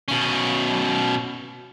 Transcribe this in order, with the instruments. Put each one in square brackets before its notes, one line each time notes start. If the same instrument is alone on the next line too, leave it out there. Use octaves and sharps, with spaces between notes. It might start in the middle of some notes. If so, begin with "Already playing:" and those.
[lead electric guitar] B2 C#4